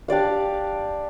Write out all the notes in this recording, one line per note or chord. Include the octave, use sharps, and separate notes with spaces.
D4 G4 D5 F5